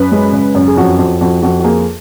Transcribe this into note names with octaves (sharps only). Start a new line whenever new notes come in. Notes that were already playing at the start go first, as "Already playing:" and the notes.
Already playing: F#2 B4
G#3
C#3
F#2
G#4
F2 F#4
F2 F#4
F2 F#4
F2 F#4
F#4
A#3 G#4